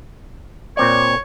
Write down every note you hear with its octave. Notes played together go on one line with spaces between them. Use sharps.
A#2 C4 C#5 D5